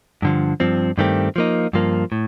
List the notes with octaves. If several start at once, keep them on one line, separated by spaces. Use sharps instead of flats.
G2 D3 F3
G2 F3 C4
G2 D#3 A3 C4 G4
F3 A#3 D#4
G2 F3 A#3
A2